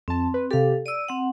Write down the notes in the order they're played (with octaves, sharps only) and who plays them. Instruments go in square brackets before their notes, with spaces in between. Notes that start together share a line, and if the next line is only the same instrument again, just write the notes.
[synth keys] F2 A5 [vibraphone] C4
[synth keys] B4
[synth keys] C3 G4 [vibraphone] A4 F5
[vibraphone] D5 E6 [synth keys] D#7
[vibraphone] C4 F#5